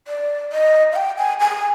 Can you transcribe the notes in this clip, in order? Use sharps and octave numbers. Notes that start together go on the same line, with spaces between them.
D5
D#5
F5
G5
G#5
G#5